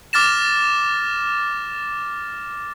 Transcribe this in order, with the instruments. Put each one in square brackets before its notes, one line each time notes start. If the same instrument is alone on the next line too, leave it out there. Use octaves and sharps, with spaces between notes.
[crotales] D6 F6 A6 A#6 E7